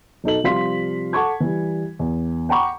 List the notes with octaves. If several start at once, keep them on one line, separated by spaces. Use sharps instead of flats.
B1 D#4 A4 F#7
C3 F3 G3 F5 C6 B6
A4 F#5 A5 C#6 D6 G#6
E3 G3
E2
F#5 G5 A#5 B5 C#6 D6